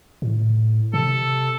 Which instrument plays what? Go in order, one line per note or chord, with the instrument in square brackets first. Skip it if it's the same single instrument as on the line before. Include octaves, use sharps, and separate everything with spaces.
[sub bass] A2
[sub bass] C3 [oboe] A4